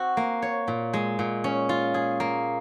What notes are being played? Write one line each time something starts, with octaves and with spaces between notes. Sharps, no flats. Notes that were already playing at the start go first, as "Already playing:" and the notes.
Already playing: C4 F#4
A#3
C#5
A#2
G#3
A#2
C#4
F4
G#4
A#3